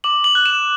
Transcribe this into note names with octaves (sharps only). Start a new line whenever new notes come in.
D6 F#7
F#7
F#6
E7